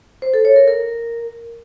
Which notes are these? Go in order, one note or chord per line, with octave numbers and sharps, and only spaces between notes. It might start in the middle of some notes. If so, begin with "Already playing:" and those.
C5
A4
C#5
A#4
A#4